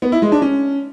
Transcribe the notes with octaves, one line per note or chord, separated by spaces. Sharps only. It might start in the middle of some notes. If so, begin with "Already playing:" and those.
B3
E4
G#3
D4
C#4